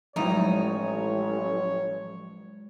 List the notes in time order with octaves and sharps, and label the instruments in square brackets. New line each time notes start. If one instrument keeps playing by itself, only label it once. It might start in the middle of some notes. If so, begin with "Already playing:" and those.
[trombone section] A1 [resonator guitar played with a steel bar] E2 D#4 [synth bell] F3 F#3 G#3 [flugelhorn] C#5